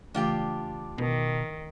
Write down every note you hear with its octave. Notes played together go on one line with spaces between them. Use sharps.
C#3 E3 A3 D4 F4 G4
B2 D#3